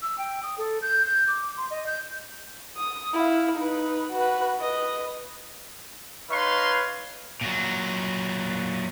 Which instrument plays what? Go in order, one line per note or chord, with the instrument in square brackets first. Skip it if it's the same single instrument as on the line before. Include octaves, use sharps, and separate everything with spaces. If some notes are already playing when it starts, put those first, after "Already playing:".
[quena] E6
G5
D#6
A4
G6
G6
D6
C6
D#5
G6
[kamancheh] D#6
E4 F5
D#4 B4
F#4 B4
B4 D#5
[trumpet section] D#4 B4 C#5 F5 C6
[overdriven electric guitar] A#2 F#3